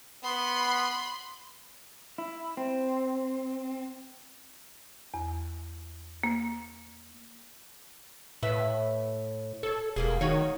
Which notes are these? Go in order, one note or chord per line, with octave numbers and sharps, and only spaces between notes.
B3 B5 C6
E4
C4
E2
A#3
A2 B4 E5
A4 C#5
E1 G3 A#3 G#4
D#3 D#4 F#4 C#5